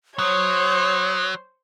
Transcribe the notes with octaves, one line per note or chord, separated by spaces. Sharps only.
F#3 C5 C#5 D#6